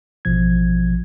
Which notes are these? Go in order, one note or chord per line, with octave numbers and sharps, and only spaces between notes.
A1 B2 F3 G#6